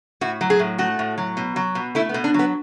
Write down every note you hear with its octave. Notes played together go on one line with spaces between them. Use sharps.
A2 F#4
F#3
G#4
A2
A3 F#4
A2
F#3
B2
F#3
B2
A3 E4
B3
B2
D4
F#3 B3